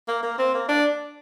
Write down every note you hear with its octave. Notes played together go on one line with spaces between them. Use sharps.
A#3
A#3
C4
A#3
D4